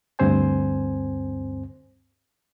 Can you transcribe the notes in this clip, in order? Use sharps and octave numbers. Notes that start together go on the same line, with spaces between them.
D2 G2 C4 C5 G#5